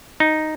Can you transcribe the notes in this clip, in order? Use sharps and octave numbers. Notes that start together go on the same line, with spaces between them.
D#4